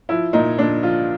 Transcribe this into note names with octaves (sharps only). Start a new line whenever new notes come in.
F3 E4
A#2 D#4
A#2 D4
F3 F4